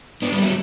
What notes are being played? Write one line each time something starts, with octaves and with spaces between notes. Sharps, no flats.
B3 D4
G3 B3
F#3 A3